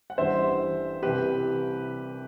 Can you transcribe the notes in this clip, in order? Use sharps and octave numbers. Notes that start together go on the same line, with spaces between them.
F#5
A1 G2 E3 G3 C5 E5
C2 C3 E3 G3 G4 B4